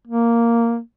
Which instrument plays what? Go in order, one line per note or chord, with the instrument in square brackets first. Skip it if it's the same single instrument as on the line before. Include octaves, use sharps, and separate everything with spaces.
[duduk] A#3